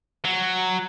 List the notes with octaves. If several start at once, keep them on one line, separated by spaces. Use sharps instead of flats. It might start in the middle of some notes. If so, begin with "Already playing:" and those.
F#3